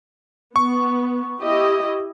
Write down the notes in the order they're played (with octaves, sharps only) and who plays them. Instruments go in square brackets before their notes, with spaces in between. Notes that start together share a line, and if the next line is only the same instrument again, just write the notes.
[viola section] B3 [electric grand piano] C#6
[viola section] E4 G4 D#5